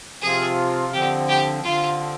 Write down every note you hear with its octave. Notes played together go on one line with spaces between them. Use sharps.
C3 F3 C4 F4 G#4
D3 F3 C4 G4
G4
D3 F3 C4 F4